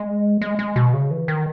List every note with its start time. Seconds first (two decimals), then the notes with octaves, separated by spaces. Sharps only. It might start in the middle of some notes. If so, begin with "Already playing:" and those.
Already playing: G#3
0.41 G#3
0.59 G#3
0.76 B2
0.94 C#3
1.11 E3
1.28 D#3